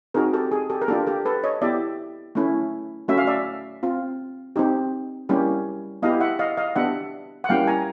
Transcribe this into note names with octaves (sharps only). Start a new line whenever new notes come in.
C4 D#4 F#4 G#4 A#4
G4 A4
G#4
G4 A4
A#4
A#3 D4 F4 G4 A4
G4 A4
A4 B4
C#5 D#5
B3 E4 G4 D5 E5
A3 C#4 E4
A3 C#4 F#4 E5
F5
D5 E5
C4 F4
C4 D#4 G4
G3 A#3 C#4 E4 G4
B3 E4 G4 D#5 F5
E5 F#5
D#5 F5
D#5 F5
B3 D4 G4 E5 F#5
F#5
G3 A#3 C#4 E4 G4 F5 G5
G#5 A#5